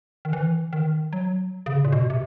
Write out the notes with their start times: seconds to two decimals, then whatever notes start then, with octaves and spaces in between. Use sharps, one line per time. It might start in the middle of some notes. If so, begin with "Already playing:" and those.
0.25 D#3
0.33 E3
0.73 D#3
1.13 F#3
1.66 C#3
1.85 A#2
1.92 B2
2.10 C3